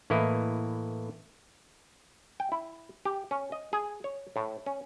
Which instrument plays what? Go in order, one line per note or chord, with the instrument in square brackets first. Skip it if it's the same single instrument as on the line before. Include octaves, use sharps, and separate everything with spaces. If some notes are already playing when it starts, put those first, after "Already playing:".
[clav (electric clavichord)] A2 E3 A#3 E4 D#5
G5
E4
G4
C#4
D#5
G#4
C#5
A2
C#4